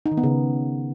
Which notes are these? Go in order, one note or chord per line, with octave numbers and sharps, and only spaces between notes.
D#4
D#3
B3
C#3